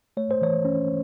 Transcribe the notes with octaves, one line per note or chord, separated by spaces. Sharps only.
A3 C#5
C5
E3 C#5
C#4